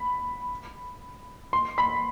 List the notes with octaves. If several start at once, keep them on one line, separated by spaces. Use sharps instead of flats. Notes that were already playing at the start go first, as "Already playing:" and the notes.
Already playing: B5
C6
B5